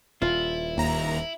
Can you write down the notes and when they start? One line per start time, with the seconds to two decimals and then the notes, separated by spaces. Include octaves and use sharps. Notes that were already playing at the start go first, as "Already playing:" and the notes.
0.22 D#1 E4 F4
0.77 D#2 A#5